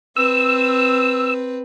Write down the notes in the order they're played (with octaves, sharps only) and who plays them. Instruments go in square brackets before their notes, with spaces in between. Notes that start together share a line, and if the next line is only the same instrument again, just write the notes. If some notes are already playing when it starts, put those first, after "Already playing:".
[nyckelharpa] C4 B4 [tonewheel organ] E6